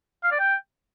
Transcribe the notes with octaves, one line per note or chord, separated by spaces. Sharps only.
F5
D5
G5